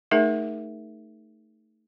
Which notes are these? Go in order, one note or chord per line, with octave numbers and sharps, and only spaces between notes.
A3 D#4 G#4 A#4 E5